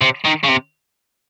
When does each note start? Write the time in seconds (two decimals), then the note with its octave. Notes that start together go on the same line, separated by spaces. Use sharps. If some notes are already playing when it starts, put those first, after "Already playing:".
0.01 C3
0.25 D#3
0.44 C#3
0.49 C3